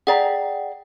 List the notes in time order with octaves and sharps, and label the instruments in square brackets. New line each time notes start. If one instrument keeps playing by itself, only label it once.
[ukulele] G#4 D5 A#5 [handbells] F#5 G5